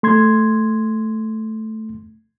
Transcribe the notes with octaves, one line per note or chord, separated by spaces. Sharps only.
A3 C6 G#6